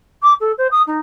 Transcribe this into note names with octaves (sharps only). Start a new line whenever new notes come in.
D6
A4
C5
D#6
D#4